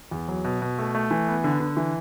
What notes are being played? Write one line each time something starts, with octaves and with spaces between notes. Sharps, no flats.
E2
F#3
B2
B2
A3
A3
E3
B3
D3
D3
E3